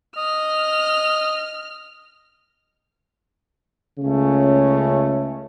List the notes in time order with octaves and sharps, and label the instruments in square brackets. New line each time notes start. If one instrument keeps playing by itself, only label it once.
[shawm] D#5 [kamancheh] F6
[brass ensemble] C#2 C#3 A3 C#4